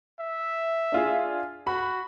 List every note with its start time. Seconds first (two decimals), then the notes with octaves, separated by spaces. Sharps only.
0.20 E5
0.92 D4 F4 G#4
1.67 F#4 B5